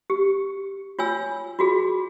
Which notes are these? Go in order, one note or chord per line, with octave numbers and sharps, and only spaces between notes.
G4
F4 C#5 G#5 E6
F4 F#4 G#4